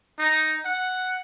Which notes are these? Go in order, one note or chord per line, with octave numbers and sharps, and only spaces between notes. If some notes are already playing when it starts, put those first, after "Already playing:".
D#4
F#5